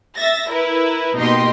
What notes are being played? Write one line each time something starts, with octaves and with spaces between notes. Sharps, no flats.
E5 A6 A#6
E4 A#4 B4
B2 A#3 D#4 G4 D#5 C6